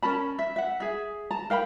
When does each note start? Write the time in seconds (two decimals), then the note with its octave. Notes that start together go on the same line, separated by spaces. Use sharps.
0.03 C#4 A#4 A5 B5
0.39 E5
0.56 E5 F#5
0.80 G#4 E5
1.31 A5 A#5
1.50 A#4 F5 G5 B5